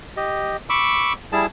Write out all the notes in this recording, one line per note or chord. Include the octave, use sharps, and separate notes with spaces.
G4 D#5
B5 C#6 D6 E6
G3 E4 G#4 A5